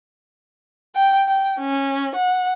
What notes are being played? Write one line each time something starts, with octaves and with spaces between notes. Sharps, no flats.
G5
G5
C#4
F#5